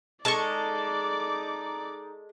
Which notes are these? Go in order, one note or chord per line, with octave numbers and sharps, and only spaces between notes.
G#3 D#4 A4 D5 A5 C#6 D6